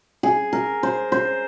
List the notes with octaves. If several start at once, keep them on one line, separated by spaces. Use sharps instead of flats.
G#4
A#4
C5
C5